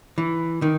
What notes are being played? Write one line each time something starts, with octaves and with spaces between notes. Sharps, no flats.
E3
D#3